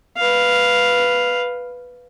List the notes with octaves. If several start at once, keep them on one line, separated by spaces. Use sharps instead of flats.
B4 F5